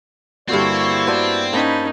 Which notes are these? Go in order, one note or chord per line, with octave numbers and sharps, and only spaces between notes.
G2 D3 A#3 C4 E4 F#4 D5 C#6
B3 F#4 C5 D5 A5
A#3 C#4 D#4 C5 A5 B5